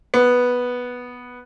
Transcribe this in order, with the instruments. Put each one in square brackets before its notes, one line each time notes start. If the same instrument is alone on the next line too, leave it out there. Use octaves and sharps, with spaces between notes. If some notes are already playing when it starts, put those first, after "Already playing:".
[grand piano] B3